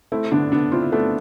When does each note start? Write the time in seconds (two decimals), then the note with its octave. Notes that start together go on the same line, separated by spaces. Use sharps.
0.12 A3 C4 E4
0.32 D3 B3 D4
0.52 D3 B3 D4
0.72 C4 E4 F4
0.82 E4
0.92 A3 B3 D4